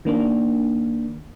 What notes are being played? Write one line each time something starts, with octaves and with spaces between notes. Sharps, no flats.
D#3 A#3 D4